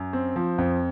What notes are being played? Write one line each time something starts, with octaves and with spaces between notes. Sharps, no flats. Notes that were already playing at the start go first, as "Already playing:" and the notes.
Already playing: F#2
C4
F3
F2